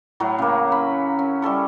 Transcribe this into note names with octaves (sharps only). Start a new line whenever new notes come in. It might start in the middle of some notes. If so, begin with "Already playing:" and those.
A2 F#3 E4 C#5
C#3 A#3
C#4 B5
C#4
G3 E4 A4 C#6